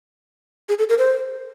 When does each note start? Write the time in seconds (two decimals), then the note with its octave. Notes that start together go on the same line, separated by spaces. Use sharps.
0.69 G#4
0.79 A4
0.89 A#4
0.98 C5